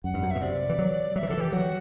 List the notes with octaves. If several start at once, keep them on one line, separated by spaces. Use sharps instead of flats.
F#2 F#5
G2
F#2
B2 E5
C3 D5
E3
F#3
F#3 E5
E3
D3 A4
E3 G4
F#3 F#4